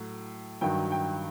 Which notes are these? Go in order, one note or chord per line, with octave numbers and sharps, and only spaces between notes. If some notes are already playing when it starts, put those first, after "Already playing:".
Already playing: A2 F#3
G2 D#3 F#3 G5
G5